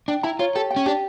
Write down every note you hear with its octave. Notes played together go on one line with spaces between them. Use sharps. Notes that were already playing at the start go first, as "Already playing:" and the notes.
D4 G5
E4 A#5
F4 C#5
G4 A4
G5
C#4
D4 G4